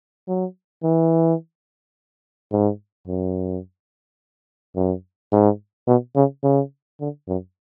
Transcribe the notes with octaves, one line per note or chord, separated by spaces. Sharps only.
F#3
E3
G#2
F#2
F#2
G#2
B2
C#3
C#3
D3
F#2